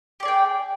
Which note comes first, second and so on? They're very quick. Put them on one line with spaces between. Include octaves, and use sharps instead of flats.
G4 D5 G#4 G5